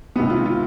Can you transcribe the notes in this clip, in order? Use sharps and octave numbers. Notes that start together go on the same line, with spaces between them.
C#2 C3 D#3 B3
F4
F4